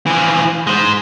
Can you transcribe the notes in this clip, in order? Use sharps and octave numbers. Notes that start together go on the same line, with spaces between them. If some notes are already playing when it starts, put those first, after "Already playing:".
E3 F3
G#3 C5